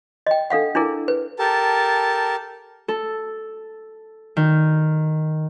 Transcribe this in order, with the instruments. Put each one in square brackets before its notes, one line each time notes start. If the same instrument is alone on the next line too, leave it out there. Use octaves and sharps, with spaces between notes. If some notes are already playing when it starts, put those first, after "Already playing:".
[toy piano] D#5 G5
D4 A4 F5 F#5
D4 E4 G#4 A#4
B4
[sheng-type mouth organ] G4 A4 A#4 A5
[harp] A4
D#3